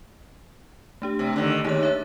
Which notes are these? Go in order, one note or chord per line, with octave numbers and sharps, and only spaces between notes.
A3 D4 G4
C3
D3 D#3
D#2 D#4 G#4 F#6
C#5 E5